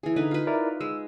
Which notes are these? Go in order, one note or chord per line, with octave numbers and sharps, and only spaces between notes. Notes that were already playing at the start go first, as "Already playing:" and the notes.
E3 G#4
D3 D#4 B4
F4 B4
E4 A#4 D5
G#3 E6